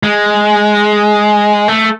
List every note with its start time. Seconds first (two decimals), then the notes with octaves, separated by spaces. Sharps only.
0.03 G#3
1.68 A3